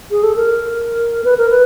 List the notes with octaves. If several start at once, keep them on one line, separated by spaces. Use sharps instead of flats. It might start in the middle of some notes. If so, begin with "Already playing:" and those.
G#4
A4
A#4
B4
A#4
B4